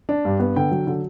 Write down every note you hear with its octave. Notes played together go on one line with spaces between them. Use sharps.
D4
G2
B3
D3 G5
F#3
D3